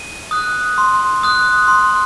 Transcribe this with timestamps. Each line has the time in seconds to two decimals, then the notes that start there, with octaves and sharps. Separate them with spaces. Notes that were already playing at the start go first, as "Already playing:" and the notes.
Already playing: D#7
0.31 D#6 F#6
0.78 C6
1.23 D#6 F#6
1.68 C6